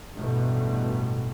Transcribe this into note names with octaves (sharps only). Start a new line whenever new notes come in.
A1 G2 B2 A3